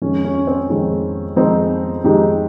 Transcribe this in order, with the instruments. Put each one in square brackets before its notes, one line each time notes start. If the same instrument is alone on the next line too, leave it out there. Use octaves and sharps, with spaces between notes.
[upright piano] F2 D#3 G#3 C#4
C#4
C4
F2 D#3 G#3
F2 D#3 G#3 C4 D#4
F2 D#3 G#3 D#4 G4